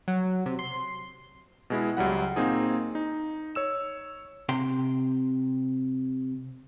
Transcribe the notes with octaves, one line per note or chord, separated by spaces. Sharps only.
F#3
C3
C6
B2 G#3 E4
C#2 F#3 G3 F#5
A#2 A#3 C4 D#4 G#4
D#4
C#5 E6 E7
C3 G5 C6